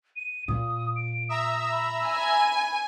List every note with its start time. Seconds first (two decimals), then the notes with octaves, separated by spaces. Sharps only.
0.16 D#7
0.48 A#2 D#6
0.96 D7
1.29 E5 A#5 D#6 E6
1.72 B5
2.07 G#5